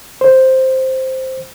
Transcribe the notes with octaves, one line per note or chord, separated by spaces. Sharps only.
C5